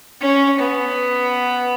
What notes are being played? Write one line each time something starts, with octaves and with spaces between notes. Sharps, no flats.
C#4
B3